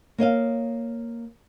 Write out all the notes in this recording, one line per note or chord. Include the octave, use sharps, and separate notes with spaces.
A#3 C#5 D#5 F5